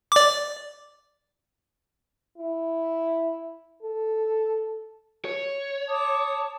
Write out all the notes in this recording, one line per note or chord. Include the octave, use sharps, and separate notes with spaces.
D5 D6
E4
A4
C#5
A5 D6 D#6